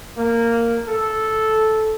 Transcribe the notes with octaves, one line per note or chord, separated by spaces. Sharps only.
A#3
A4